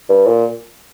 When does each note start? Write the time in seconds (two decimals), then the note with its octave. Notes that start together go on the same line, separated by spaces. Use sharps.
0.09 G2
0.27 A#2